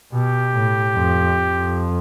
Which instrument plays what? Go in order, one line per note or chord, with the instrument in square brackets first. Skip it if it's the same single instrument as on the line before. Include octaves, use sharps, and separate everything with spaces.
[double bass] B2 [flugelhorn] G4
[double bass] A2
F2
F2